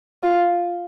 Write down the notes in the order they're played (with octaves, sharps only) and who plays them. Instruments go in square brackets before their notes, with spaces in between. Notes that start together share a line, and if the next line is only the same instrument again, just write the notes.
[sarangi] F4